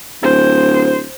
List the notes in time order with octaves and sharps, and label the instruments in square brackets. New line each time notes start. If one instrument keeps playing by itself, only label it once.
[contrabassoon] D1 [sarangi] C5